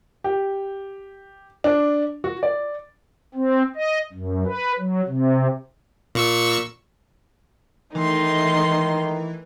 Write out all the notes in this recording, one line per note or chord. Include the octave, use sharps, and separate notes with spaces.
G4
D4
F#4
D5
C4
D#5
F#2
B4
F#3
C3
A#2 C#6 E6
D#3 E3 A3 D#4 C6